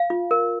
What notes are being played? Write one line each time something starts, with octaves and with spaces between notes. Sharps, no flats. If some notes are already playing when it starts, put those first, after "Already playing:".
Already playing: F5
F4
A#4